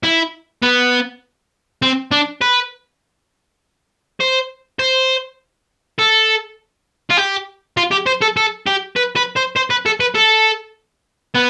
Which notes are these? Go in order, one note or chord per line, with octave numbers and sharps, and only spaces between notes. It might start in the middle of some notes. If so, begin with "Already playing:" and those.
E4
B3
C4
D4
B4
C5
C5
A4
F4
G4
F4
G4
C5
A4
A4
G4
B4
B4
C5
C5
B4
A4
B4
A4
B3